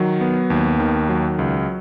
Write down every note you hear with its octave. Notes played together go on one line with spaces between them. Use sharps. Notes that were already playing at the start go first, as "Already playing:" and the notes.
Already playing: D#3 F#3
B3
D#2
D#3
F#3
C#2